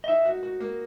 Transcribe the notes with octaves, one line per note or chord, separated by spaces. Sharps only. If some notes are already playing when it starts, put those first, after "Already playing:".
D#5
D#4 E5
F#4
F#4
A#3